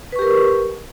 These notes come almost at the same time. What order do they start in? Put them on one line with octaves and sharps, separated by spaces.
B4 C#6 G4 A#4